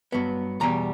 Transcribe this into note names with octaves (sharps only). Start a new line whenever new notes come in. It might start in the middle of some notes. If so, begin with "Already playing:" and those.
G2 F#3 B3
E2 B2 G3 A#5